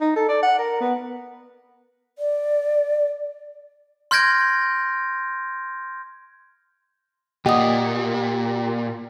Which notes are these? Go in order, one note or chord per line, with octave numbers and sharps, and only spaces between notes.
D#4
A4
D5
F#5
A#4
B3
D5
C6 F6 G6 G#6 A#6 D7
A#2 G4 D#5 F#5 D#6